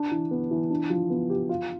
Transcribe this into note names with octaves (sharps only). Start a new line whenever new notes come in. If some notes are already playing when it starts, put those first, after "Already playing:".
Already playing: D4
E3
B3
E3
D4
F3
B3
G4
F4